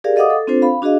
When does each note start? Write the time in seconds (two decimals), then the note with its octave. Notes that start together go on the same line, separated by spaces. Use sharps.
0.04 G4 G#4 A#4 D5 F5
0.16 A4 D#5 F5 F#5 D6 D#6
0.30 A4
0.47 C4 D4 F4 A4 C5
0.62 F5 B5
0.82 D4 F#4 G#4 D#5 F5